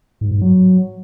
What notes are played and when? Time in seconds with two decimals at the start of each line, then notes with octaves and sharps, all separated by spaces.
0.21 G#2
0.31 G#2
0.41 F#3